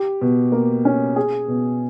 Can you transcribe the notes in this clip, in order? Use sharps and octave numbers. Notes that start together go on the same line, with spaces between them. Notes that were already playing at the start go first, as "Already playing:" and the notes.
Already playing: G4
B2
A#3
C#4
G#4
B2